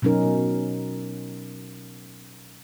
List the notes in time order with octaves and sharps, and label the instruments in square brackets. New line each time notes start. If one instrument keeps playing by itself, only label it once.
[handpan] B2 F#3 C#4 D#4 A#4